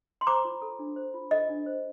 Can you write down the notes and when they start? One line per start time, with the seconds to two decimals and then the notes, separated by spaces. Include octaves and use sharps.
0.21 C6
0.27 C5 A#5 D6
0.45 F4
0.62 A4
0.79 D4
0.96 C5
1.14 F4
1.31 A4 D#5
1.49 D4
1.66 C5